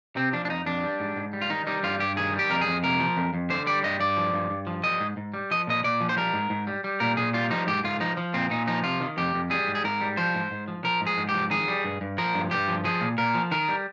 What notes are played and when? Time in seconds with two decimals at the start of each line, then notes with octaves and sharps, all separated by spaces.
0.16 C3 C4
0.33 F3 D4
0.45 D4
0.49 F2 D#4
0.66 F2 D4
0.84 G3
1.00 G#2
1.16 G#2
1.33 G3
1.42 F4
1.50 D#3 D#4
1.67 G3 D#4
1.83 G2 F4
1.99 G2 G4
2.17 D#3 G#4
2.33 G3
2.39 G4
2.50 F2 A#4
2.61 G#4
2.66 F2
2.83 C3 A#4
3.00 F3
3.17 F2
3.34 F2
3.50 D3 C5
3.67 G3 D5
3.83 G2 D#5
4.00 G2 D5
4.17 F3
4.34 G2
4.50 G2
4.67 F3
4.83 G3 D#5
5.00 G#2
5.17 G#2
5.34 G3
5.51 F3 D#5
5.67 A#2 D#5
5.84 A#2 D5
6.01 F3
6.09 C5
6.17 G3 A#4
6.34 G#2
6.50 G#2
6.67 G3
6.84 G3
7.00 A#2 A#4
7.17 A#2 G#4
7.34 G3 F4
7.50 F3 D#4
7.67 G#2 G4
7.84 G#2 F4
8.00 F3 D#4
8.17 F3
8.34 A#2 C4
8.50 A#2 D#4
8.67 F3 D#4
8.84 C3 F4
9.01 D#3
9.17 F2 G4
9.34 F2
9.50 G3 G#4
9.68 G#2
9.75 G#4
9.84 G#2 A#4
10.01 G3
10.17 F3 C5
10.34 G#2
10.51 G#2
10.68 F3
10.84 F3 A#4
11.01 G#2
11.07 G#4
11.18 G#2
11.29 G4
11.34 F3
11.51 D#3 G#4
11.68 G3
11.84 G2
12.01 G2
12.18 F3 A#4
12.34 G2
12.51 G2 G4
12.68 F3
12.84 F3 G#4
13.01 A#2
13.18 A#2 A#4
13.35 F3
13.51 D#3 A#4
13.68 G3